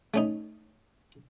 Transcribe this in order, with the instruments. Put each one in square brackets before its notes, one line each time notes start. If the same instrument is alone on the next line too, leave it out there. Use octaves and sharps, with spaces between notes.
[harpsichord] A3 C#4 D#4